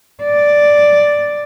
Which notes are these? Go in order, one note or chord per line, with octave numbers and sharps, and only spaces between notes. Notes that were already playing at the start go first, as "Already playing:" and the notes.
D5